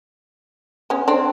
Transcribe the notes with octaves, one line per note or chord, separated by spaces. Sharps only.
B3 C#4
C4 D4